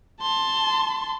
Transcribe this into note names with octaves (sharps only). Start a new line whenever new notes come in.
A5 C6